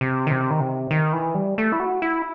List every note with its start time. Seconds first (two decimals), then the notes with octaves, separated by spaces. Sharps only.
0.01 C3
0.27 D#3
0.31 C3
0.50 D#3
0.61 C3
0.91 D#3
1.13 E3
1.35 G3
1.58 A3
1.72 E4
1.80 F#4
2.02 E4